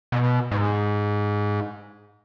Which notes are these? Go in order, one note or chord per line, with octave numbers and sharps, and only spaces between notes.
B2
G#2